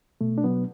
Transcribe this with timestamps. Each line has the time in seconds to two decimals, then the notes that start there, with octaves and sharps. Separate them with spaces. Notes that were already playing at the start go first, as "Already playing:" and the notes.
0.21 B2 A3
0.38 D4
0.44 F#3 B3